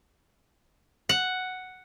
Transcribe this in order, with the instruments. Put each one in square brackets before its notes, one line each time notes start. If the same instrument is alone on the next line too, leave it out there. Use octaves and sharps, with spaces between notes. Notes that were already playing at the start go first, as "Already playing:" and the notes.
[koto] F#5